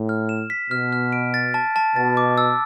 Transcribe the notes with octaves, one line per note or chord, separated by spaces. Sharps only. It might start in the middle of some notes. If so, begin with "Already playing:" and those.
Already playing: A2
F6
E7
B6
B2 F6
F6
D7
A6
A5
A5
B2 A6
D6
E6